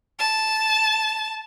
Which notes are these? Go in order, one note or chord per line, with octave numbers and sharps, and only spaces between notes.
A5